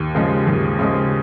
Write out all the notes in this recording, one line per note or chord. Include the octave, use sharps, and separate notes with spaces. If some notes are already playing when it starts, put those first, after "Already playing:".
Already playing: D#2
C#3 F3 G#3
D#2
C#3 F3 G#3